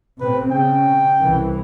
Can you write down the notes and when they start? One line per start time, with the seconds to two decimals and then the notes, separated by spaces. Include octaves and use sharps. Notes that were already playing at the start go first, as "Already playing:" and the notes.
0.20 A2 C3 C4 B4
0.51 C#3 G5
1.21 C2 E3